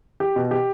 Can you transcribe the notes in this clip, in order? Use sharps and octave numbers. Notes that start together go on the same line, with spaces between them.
G4
B2
G4